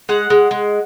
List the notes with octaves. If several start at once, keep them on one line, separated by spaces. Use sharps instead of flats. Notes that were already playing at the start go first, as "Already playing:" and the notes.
G#3 F#5
G#3
G#3